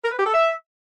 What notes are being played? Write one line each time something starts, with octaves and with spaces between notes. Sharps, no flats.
A#4
B4
G4
A4
E5